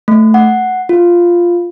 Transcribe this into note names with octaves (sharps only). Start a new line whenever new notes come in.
A3
F#5
F4